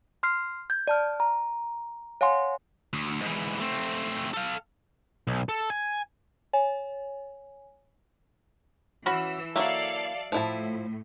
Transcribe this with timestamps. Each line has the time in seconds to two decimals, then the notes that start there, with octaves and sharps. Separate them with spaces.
0.23 C6 F6 C7
0.70 G6 G#6
0.87 D5 A5 F6
1.20 A#5
2.21 C#5 F5 F#5 G#5 C6
2.93 D2
3.22 G#2 E3
3.60 A3 C4
4.34 A4 F5
5.27 B1
5.49 A4
5.70 G#5
6.53 C#5 G#5
9.06 E3 C#4 F#4 B5 E6
9.56 F#3 A#3 E4 A4 D5 E5 F5
10.32 A2 F3 E4 A5